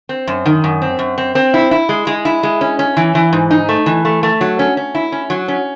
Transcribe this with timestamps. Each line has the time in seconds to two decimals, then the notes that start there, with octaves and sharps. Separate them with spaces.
0.09 C4
0.27 F#2
0.46 D#3
0.64 F#2
0.82 C4
0.99 F#2
1.18 C4
1.35 C4
1.54 E4
1.71 E4
1.89 G#3
2.07 G#3
2.25 E4
2.43 G#3
2.61 C#4
2.79 C#4
2.97 E3
3.15 E3
3.33 G#2
3.51 D#4
3.69 A3
3.86 E3
4.05 A3
4.23 A3
4.41 F#3
4.59 C#4
4.77 C#4
4.95 E4
5.12 C#4
5.30 F#3
5.48 C#4